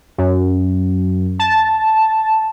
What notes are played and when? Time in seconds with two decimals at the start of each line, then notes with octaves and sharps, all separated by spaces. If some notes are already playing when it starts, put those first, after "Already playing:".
0.18 F#2
1.39 A5